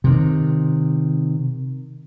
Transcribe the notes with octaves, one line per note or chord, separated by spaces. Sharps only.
C3 D#3